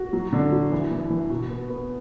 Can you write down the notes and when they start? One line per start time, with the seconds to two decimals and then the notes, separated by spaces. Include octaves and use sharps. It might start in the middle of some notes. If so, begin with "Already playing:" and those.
Already playing: F#4
0.13 F#3
0.33 D3
0.52 F#3
0.72 E3
0.91 E3
1.10 E3
1.30 B2
1.50 B3
1.70 B3